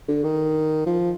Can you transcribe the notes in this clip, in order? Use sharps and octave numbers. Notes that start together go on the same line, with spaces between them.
D3
D#3
F3